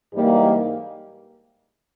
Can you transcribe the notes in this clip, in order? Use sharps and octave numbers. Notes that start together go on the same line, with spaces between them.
G#2 E3 G3 A#3 D#4